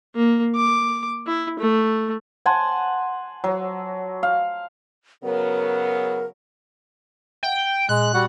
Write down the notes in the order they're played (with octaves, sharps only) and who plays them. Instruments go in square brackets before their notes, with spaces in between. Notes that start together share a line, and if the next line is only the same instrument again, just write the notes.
[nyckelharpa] A#3
D6
E4
A3
[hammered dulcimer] F#5 G#5 A5 C6
F#3
F5
[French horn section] C#3 F#3 B3 [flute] A#4
[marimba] E5 F#5 [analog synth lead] G5
[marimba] A#2 [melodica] G#3 [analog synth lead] F#6
[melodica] G3 F#4 F#5